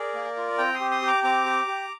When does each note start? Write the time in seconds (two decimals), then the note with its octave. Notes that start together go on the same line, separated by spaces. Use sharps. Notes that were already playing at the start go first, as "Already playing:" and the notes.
Already playing: G#4 A#4 D5
0.15 A#3
0.37 F4
0.58 C4 G5 A#5
0.74 C6 D#6
0.80 G4
0.91 C6 D#6
1.02 G4
1.08 A#5 D6
1.24 C4 A#5 D6
1.46 G4
1.67 G4